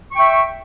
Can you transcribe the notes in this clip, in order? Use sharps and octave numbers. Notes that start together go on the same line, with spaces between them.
E5 G5 C#6